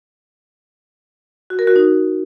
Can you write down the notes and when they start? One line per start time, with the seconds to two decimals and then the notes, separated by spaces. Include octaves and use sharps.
1.50 F#4
1.59 A#4
1.67 F#4
1.76 D#4